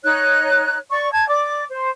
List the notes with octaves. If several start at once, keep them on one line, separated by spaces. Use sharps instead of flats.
D#4 C#5 F#6
D5 C#6
A5 G#6
D5 D6
C5